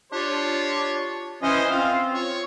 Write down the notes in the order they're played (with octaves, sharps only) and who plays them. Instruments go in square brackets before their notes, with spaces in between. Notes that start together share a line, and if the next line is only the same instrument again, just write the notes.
[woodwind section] D4 F4 G4 [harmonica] C#5
[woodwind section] E3 C#4 [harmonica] C5 D#5
[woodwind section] C4 F4 [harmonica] F5
[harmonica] C#5